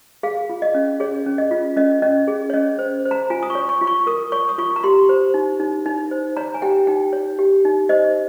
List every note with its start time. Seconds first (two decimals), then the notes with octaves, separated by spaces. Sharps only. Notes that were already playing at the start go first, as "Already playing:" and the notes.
0.23 G#4 F5
0.50 F4
0.62 D#5
0.75 C#4
1.00 G#4 C#5
1.26 C#4
1.38 D#5
1.51 F4
1.77 C#4 D#5
2.02 C#4 D#5
2.28 G#4
2.50 C#5
2.53 C#4 D#5
2.79 C5
3.05 C5
3.11 A#5
3.30 F4 G#5
3.43 D#6
3.50 C#6
3.55 C#5
3.69 C#6
3.81 F4
3.87 C#6
4.07 A#4 D#6
4.32 C#5 C#6
4.49 D#6
4.58 F4 C#6
4.76 A#5
4.84 G4 C6
5.09 C5
5.34 D#4
5.60 D#4
5.86 D#4
6.11 C5
6.37 C#5 A#5
6.54 G#5
6.62 G4 G5
6.87 D#4 G5
7.13 C#5
7.39 G4
7.65 D#4
7.89 C5 D#5